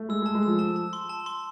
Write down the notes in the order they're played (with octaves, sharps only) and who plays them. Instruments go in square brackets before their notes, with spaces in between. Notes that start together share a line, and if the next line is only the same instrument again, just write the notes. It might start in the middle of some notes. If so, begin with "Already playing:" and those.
Already playing: [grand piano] A3
[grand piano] G#3 [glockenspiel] E6
[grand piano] G#3
[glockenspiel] A5
[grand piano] G#3
[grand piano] F3 [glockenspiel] E6
[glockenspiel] A5
A5
C6
A5
C6